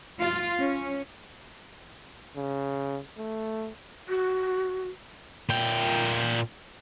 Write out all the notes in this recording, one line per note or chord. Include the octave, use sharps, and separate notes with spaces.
F4
C#4
C#3
A3
F#4
A#2 G5